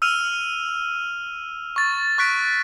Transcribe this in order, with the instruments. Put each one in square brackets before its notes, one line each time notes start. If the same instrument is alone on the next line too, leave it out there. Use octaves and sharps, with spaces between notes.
[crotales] E6 F6 D#7 F7
C#6 A6
C#6 F#6 B6 D7